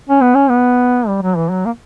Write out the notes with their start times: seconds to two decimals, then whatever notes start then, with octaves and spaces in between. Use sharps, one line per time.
0.09 C#4
0.21 B3
0.35 C#4
0.50 B3
1.08 G3
1.22 F#3
1.36 E3
1.50 F#3
1.66 A#3